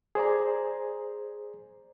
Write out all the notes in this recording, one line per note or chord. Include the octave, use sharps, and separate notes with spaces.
G#4 C5 D5 A#5